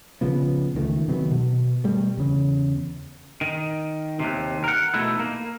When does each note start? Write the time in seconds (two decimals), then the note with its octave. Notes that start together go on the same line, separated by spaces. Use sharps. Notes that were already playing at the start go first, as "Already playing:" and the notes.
0.21 A#1 C#3 F3 B3
0.75 C#2 D#3 G3 A3
1.08 C3 D#3 F#3 B3
1.31 B2
1.84 B2 G3 A3
2.18 E2 C#3
3.41 D#3
4.20 D#2 C3
4.64 A#4 F#5
4.94 B2 A3 D#4 E4
5.20 A#3